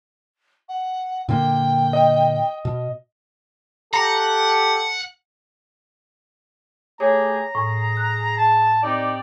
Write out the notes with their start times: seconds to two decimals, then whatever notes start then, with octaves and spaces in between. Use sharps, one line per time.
0.69 F#5
1.29 A#2 D3 A#3 G5
1.93 D#5
2.65 B2
3.94 G4 A4 F#5 A#5
7.00 A3 G4 G#4 C#5 A#5
7.55 A2 G#4
7.97 F#6
8.38 A5
8.83 C4 D#4 G4 D5